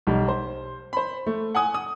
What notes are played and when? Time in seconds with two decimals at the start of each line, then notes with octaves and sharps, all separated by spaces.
0.07 B1 G3
0.28 C5
0.93 C5 B5
1.27 A3
1.55 F#5 G#5 D#6
1.74 D#6